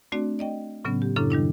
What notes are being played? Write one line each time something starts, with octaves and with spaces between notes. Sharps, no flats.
A3 C4 D4 F#4 D5
D5 D#5 G5
A2 C#3 F#3 B3 C#4
G4
F#2 A2 C#3 D4 E4 A4
D#3 G3 D4 E4